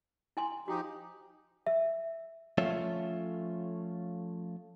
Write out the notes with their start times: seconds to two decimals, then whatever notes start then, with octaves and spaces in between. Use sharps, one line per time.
0.37 E4 G#5 C6
0.68 F3 D#4 F#4 G4
1.67 E5
2.58 F3 A3 C#4 F4 C#5 E5